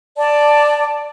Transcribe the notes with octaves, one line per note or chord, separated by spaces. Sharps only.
D5 A5